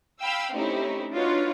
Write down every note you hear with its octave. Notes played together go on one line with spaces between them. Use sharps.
F5 G5 B5 E6
A3 C4 C#4 D#4 E4 G4
D4 D#4 F4 F#4 B4 C#5